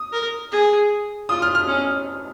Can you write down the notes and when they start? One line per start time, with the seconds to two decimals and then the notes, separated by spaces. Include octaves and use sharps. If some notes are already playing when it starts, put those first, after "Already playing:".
Already playing: D#6
0.13 A#4
0.52 G#4
1.29 F4 D#6
1.42 F6
1.55 F6
1.68 C#4